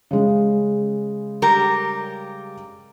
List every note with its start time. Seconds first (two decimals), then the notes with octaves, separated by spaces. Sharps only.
0.11 C#3 G#3
1.42 G3 G4 A#4